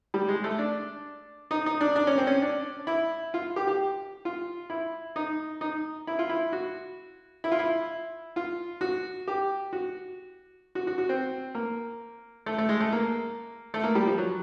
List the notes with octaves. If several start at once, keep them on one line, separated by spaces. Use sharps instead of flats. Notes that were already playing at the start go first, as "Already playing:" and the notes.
G3
G#3
A3
D4
D#4
D#4
D4
D4
C#4
C4
C#4
D4
E4
F4
G4
G4
F4
E4
D#4
D#4
E4
F4
E4
F#4
E4
F4
E4
F4
F#4
G4
F#4
F#4
F#4
F#4
C4
A#3
A3
A3
G#3
A3
A#3
A3
A#3
G3
F3
F#3